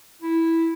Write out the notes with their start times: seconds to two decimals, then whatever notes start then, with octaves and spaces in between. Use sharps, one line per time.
0.22 E4